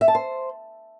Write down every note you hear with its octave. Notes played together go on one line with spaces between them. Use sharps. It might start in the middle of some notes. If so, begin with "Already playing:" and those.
E5
A5
C5